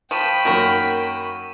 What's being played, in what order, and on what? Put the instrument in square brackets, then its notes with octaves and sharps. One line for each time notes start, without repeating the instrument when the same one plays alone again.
[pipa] F3 [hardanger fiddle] G5 B5 [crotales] C#6 D#7 E7
[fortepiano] F#2 A#3 F#4 [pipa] D#3 A#4